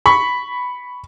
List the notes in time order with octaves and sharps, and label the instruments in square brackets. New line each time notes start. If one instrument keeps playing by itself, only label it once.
[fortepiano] B5 C#6